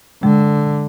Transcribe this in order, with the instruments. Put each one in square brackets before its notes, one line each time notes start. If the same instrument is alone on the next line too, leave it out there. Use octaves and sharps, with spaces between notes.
[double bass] D3 [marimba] G#3